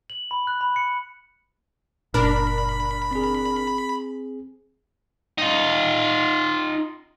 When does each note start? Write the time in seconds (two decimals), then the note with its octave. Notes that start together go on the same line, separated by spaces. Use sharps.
0.10 F#7
0.31 B5
0.47 F#6
0.61 B5
0.76 C#7
2.14 F#1 A#2 D4 A#4 B5
3.11 C4 G#4
5.38 D#4 F4